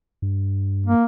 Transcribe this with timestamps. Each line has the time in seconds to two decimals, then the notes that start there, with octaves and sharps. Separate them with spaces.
0.22 G2
0.86 A#3